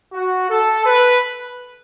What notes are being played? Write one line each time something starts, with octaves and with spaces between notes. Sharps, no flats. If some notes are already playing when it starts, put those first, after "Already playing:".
F#4
A4
B4